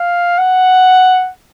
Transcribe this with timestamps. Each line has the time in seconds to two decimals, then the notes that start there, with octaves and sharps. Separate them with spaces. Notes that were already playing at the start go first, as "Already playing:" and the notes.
Already playing: F5
0.38 F#5